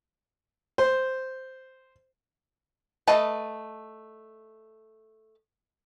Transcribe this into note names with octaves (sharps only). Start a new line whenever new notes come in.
C5
A3 B4 D#5 A5